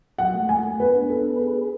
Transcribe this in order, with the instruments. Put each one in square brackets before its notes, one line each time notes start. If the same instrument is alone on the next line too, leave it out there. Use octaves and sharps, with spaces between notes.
[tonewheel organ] F#3 [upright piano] F#5
[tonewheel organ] A3
[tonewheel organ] A3 [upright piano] G#5
[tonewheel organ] A3
[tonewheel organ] B3 [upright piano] B4
[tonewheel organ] D4
[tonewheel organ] B3 [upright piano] A4
[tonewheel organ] B4
G#4
G#4